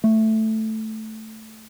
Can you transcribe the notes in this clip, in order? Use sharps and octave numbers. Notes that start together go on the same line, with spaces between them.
A3